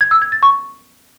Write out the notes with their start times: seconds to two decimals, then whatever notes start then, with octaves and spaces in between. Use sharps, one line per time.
0.01 G#6
0.11 E6
0.22 G#6
0.32 A6
0.43 C#6